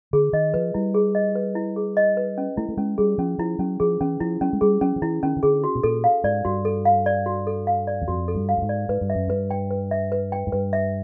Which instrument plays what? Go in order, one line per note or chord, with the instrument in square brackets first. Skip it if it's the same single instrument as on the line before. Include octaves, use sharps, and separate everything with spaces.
[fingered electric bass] D3 [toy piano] G#4
[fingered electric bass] D#3 [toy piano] D#5
[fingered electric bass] F3 [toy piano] B4
[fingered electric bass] G3 [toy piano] E4
[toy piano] G#4
D#5
B4
E4
G#4
D#5
B4
C#4
[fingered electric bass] A3 [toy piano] E4
[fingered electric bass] A3
[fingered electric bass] G#3 [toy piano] C#4
[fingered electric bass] G3 [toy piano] G#4
[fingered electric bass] F3 [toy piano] C#4
[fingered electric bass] F3 [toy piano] E4
[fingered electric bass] F#3 [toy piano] C#4
[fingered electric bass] F3 [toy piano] G#4
[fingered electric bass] E3 [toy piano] C#4
[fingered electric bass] F3 [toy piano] E4
[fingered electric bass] F#3 [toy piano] C#4
[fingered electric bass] G#3
[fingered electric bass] G3 [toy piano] G#4
[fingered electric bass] F#3 [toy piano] C#4
[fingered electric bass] F3
[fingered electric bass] E3 [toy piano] E4
[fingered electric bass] D#3 [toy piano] C#4
[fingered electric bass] D#3
[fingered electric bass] D3 [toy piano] G#4
[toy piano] F#4
[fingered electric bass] B2
[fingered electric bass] A#2 [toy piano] A4
[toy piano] F5
[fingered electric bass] G#2 [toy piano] D5
[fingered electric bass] G2 [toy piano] F#4
[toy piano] A4
F5
D5
F#4
A4
F5
D5
[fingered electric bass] E2
[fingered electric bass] F2 [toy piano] F#4
[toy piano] A4
[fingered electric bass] G2
[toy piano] F5
[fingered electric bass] G2
G#2
[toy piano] D5
[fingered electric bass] G#2 [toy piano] B4
[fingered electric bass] G2
[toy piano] E5
[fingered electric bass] F#2
[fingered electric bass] G2 [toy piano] B4
[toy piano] G5
B4
E5
B4
G5
[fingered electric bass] G#2
[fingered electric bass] G2 [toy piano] B4
[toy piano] E5